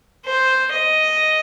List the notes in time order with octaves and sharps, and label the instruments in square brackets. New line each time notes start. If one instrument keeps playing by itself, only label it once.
[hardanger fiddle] C5
D#5